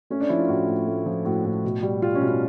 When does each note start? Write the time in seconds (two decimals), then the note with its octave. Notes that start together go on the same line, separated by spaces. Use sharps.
0.10 A3 C#4
0.20 D4
0.29 F3 E4
0.39 F4
0.48 A2 F#4
0.67 A2
0.87 A3
1.06 F3
1.25 A2 F#4
1.45 A2
1.64 B2
1.83 G3
2.02 G3 F4
2.15 C#4
2.21 B2
2.28 C#4